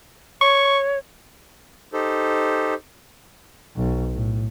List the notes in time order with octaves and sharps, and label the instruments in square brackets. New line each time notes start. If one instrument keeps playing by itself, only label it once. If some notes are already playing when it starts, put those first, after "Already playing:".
[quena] C#5 [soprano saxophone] C#6
[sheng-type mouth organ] D#4 G4 A4 C5
[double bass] B1
A2